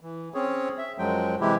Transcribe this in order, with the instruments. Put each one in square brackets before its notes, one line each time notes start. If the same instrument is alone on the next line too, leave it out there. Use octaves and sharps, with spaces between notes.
[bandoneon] E3
C4 C#4 G#4 C#5
E5
F#2 F3 F#3 G#3 G5
C3 E3 G#3 E4 G4